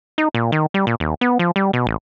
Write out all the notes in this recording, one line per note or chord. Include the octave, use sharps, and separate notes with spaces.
D#4
A#2
D#3
G3
A#2
D#2
B3
F3
G3
B2
A1